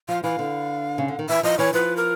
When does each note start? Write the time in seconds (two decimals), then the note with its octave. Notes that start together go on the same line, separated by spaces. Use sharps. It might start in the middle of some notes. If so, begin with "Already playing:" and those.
0.09 F3 F5
0.23 E3 F5
0.39 D3
0.98 C#3
1.08 D3
1.19 D#3
1.29 E3 E5
1.43 F3 D#5
1.59 E3 C#5
1.73 F3 B4
1.97 A#4